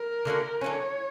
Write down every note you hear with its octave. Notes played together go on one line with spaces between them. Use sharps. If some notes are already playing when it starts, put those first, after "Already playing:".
Already playing: A#4
D3 A#3 C#4 F#4
D3 F#3 A#3 C#4 C#5